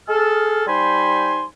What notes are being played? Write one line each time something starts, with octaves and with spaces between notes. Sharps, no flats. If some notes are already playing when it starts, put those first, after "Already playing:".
G#4 A4 F6
G3 D#4 C5 G#5 B5 C6